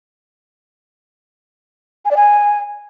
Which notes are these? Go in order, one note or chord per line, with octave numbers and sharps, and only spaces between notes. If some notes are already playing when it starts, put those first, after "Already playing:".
G#5
D5
G#5